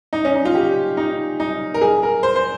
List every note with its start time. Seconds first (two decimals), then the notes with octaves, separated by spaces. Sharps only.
0.13 D#4
0.25 C#4
0.35 D#4
0.45 F4
0.55 G4
0.97 D#4
1.40 D#4
1.74 A#4
1.81 G#4
2.03 A#4
2.23 C5
2.36 C5